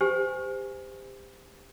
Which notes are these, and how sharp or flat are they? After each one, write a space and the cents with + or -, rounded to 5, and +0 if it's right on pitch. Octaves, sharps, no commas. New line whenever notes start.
G4 +25 C5 -25 G#5 +0